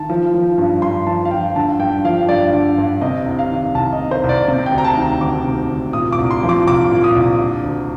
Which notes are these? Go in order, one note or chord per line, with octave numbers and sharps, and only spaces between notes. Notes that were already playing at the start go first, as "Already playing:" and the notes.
Already playing: D#3 A5
F3
F3
G2
G2 C6
F3 A5
F5
F3 G5
D3 A5
G2 G5
F3 F5
G2 D5
D3
G2
C3 D#5
C2
F5
D#3
C2 A5
D#5
C3
C5
C2
D5
C3
G5
D2
A#5
A5
D#3
A#5
D2 D6
C3
D2
A#2 D#6
D6
C2
C6
F3
D6
C2 D6
A#2
D#6
C2
D3
D2